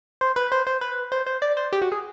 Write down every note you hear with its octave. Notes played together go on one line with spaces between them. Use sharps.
C5
B4
C5
C5
B4
C5
C5
D5
C5
G4
F#4
G#4